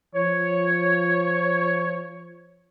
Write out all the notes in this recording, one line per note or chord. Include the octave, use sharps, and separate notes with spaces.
F3 C#5